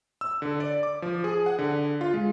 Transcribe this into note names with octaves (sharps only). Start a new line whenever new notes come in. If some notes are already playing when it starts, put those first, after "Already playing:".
E6
D3
D5
D6
F3
G#4
F#5
D3
F4
G#3